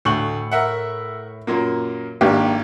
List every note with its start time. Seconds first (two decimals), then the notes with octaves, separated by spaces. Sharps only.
0.05 D2 A2 C#6 F#7
0.51 A#4 E5 F#5
1.47 F#2 A#2 A#3
2.21 G#1 A#3 D4 G4